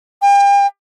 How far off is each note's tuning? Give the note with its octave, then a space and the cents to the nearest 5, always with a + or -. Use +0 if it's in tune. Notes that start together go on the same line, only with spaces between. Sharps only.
G5 +40